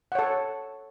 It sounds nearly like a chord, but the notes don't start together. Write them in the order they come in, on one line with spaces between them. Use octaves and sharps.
F#5 C#5 A4